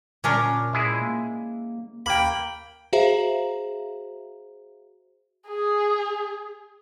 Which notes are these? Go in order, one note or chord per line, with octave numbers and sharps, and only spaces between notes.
A#2 C#4 D4 A#4
A#2 G#3 E4 G#4
A#3
D#2 A#3 G5 B5
F#4 G#4 C5 E5 F5 A#5
G#4